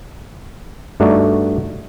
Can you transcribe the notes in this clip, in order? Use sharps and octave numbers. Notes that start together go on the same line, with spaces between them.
G2 A3 D#4 F#4 D5